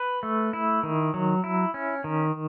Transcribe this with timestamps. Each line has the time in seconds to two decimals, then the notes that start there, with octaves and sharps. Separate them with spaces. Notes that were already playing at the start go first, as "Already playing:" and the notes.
Already playing: B4
0.23 A3
0.53 E4
0.83 D#3
1.14 F#3
1.44 E4
1.74 C#4
2.04 D#3